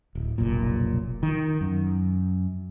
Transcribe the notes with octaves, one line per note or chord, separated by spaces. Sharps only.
D1
F1 B1 A#2
D#3
F#2